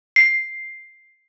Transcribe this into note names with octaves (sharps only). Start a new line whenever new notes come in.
C7